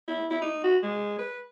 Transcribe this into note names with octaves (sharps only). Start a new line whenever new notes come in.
E4
E4
D#4
F#4
G#3
B4